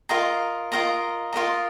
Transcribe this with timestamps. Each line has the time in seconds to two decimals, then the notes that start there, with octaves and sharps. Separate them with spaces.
0.09 F4 A#4 D#5 A#5
0.72 F4 A#4 D#5 A#5
1.33 F4 A#4 D#5 A#5